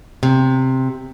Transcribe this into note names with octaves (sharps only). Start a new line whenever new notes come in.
C3